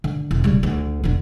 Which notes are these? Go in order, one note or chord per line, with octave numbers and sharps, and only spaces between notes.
D3
E1
C#3 G3
D2
E1 D3